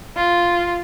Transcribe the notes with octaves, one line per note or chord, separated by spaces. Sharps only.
F4